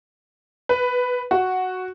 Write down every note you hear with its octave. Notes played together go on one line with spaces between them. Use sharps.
B4
F#4